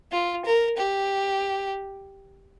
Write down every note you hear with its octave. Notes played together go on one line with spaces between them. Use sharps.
F4
A#4
G4